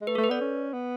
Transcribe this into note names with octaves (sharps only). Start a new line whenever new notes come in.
G#3
A3 B4
A4
A3
B4
B3 D5
C#4
B3